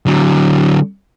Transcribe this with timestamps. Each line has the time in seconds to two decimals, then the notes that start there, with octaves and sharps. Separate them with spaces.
0.06 D3 F#3